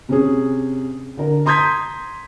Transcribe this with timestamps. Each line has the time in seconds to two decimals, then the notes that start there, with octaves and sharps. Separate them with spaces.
0.09 C3 C#4 G#4
1.17 D3 A#4
1.46 A#5 C6 D#6 G6 G#6 B6